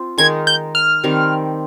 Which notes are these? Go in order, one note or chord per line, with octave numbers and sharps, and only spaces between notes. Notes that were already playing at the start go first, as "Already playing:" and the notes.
Already playing: C4 F4 C5
D#3 G#3 D#4 A#4 G#6
G6
F6
D#3 G3 C4